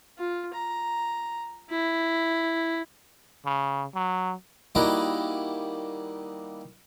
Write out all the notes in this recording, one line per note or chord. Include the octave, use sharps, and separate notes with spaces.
F4
A#5
E4
C#3
F#3
D#3 G3 A#3 D#4 E4 F#4